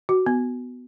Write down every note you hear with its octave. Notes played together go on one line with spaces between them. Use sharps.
F#4
B3